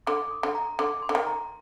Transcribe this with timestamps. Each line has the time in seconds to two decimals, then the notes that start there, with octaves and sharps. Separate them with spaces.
0.07 D3 D6
0.31 D#6
0.43 D3
0.55 A#5
0.79 D3 D6
1.02 C6
1.09 D3
1.15 D#3
1.27 A#5